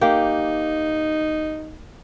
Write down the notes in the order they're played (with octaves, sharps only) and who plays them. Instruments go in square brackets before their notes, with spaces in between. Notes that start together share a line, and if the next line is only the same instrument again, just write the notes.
[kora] A#3 G4 [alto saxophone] D#4